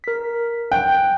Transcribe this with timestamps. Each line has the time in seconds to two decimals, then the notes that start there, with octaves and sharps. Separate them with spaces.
0.04 A#4 B6
0.72 G5 F#6